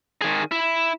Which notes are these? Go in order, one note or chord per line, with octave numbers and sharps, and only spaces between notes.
D#3 G#4
E4